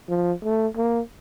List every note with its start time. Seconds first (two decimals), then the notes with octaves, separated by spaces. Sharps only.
0.09 F3
0.44 A3
0.77 A#3